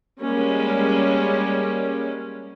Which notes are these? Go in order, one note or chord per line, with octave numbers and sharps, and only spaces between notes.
G3 G#3 A#3 C#4